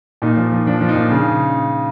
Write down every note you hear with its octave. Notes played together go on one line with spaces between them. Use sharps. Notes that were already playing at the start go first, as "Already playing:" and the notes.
A#2 D#4
F3
F3
F3 D4
F3
D#4
A#2
C#3